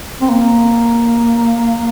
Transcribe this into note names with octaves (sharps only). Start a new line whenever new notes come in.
C4
A#3